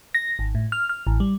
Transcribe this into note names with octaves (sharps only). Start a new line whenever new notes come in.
A#6
G#1
A2
F6
F6
A1
G3